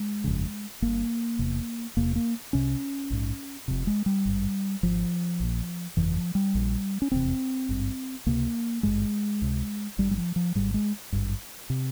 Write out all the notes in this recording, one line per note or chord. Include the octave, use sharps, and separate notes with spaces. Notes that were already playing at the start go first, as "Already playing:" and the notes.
Already playing: G#3
G1 F2 C#3
G1 G2 A#3
E1 E2 C3
E1 E2 C3 A#3
A#3
C2 C3 C#4
A#1 G#2
F1 F2 C3
G#3
G3
G#1 G2
G#1 G#2 F3
A#1 A#2
G1 F2 C#3 E3
F3
G3
A#1 A#2
C#4
F1 E2 C3 C4
G#1 G2
C#2 C3 A#3
G#1 G2 G#3
C#2 C3
G#1 G2 G3
G3
F3
F3
G#1 G#2 G3
G#3
G#1 G2
C3